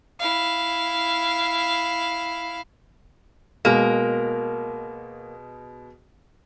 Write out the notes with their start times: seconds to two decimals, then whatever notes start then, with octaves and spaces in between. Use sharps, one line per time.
0.19 E4 F5
3.65 B2 G#3 A#3 F6